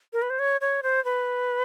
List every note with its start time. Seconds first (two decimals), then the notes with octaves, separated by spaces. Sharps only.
0.13 A#4
0.22 B4
0.30 C5
0.39 C#5
0.61 C#5
0.83 C5
1.05 B4